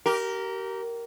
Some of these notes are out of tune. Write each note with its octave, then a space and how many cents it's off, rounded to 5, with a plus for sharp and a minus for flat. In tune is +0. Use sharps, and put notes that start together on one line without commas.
G4 -30 A#4 +0